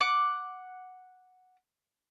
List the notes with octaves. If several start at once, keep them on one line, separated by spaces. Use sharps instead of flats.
F#5 D6